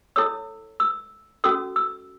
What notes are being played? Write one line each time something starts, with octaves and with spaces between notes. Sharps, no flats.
E4 A4 C#5 E6
E6
C#4 F#4 A4 E6
E6